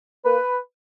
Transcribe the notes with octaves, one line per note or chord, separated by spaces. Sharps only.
A#3 B4